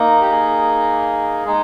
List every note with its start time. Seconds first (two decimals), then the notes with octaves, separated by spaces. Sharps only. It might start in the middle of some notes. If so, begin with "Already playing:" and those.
Already playing: A#3 D#4
0.21 G4
0.31 G#4
1.46 G#3 D#4